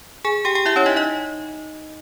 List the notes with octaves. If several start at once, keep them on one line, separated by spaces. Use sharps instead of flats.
G#4 G#5
G4 G5
G4 G5
E4 E5
C#4 C#5
D#4 D#5
D#4 D#5